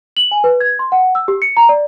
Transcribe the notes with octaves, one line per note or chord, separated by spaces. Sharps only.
F#7
G#5
B4
G#6
C6
F#5
E6
G4
C#7
A#5
D5